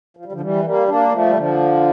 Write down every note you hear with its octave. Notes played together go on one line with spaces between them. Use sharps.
F3
G3
D3 F3
E3 G3
G3 A#3
A#3 D4
F3 A3
G3
D3 F3